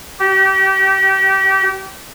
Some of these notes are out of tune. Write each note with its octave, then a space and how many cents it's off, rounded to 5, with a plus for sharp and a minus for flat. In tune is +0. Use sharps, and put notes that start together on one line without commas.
G4 -30